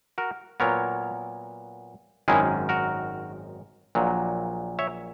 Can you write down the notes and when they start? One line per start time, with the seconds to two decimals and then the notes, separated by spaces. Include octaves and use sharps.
0.18 F#4 A#4
0.60 A#2 F#3 B3 A#4 C#5
2.28 G#1 F#2 D#3 G#3 C#4 E4 G#4
2.69 F#4 A#4
3.95 A#1 A#2 F#3
4.79 C#5 E5